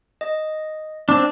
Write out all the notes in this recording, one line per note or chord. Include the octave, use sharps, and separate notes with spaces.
D#5
C4 D4 A5